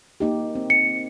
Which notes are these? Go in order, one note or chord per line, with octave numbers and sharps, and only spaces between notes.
A#3 D#4 G4
C4
C#7